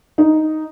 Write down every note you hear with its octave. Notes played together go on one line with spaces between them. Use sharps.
D#4